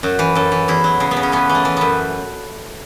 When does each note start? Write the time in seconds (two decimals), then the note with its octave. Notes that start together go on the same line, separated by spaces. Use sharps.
0.03 F#2 F#4
0.19 E3
0.35 F#2 A4
0.52 E3
0.68 E2 E4
0.84 F#3
1.00 C#3
1.11 B3
1.16 C#3
1.23 C#4
1.32 E3 B3
1.49 E3
1.55 A3
1.65 E3
1.77 F#2 B3